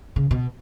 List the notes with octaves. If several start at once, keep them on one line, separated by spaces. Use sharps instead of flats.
C#3
B2